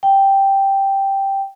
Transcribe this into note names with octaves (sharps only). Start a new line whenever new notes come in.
G5